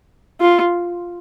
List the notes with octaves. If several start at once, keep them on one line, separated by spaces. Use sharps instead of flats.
F4